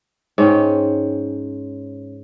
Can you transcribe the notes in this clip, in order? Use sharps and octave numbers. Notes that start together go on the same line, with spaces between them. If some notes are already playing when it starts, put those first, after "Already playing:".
G#2 C#4 G5